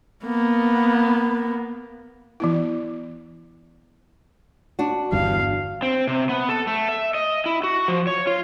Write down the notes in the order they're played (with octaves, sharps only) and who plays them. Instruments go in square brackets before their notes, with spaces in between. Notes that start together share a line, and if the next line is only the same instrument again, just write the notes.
[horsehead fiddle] A#3 B3
[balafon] E3 B3 E4
[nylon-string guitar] D4 F#4
[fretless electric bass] G1 E2 G2 [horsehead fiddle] F5
[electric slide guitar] C4
C3
B3
A4
A3
E5
D#5
E4
F#4
F3
C#5
F4